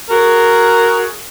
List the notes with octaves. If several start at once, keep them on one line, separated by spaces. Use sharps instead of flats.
F#4 G#4 A#4